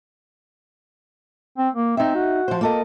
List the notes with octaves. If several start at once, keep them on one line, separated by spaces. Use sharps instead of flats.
C4
A#3
C4 D#4 E5
F#4
F3 C5
A#3 A4 D#5